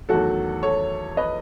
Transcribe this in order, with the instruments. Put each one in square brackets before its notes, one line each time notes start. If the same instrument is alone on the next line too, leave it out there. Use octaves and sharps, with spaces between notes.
[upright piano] E2 D#3 F#3 A3 F#4 A4
A4 C#5
B4 D#5